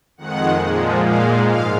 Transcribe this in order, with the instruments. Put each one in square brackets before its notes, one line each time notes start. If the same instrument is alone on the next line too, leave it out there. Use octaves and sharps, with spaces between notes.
[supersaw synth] F2 D#3 G#3 F#5
A#2 F3 G#3
A#2 G#3 F5
G#2 F5